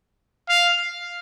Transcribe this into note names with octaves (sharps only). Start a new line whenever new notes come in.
F5